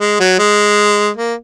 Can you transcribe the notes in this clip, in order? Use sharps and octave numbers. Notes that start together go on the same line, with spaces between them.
G#3
F#3
G#3
A#3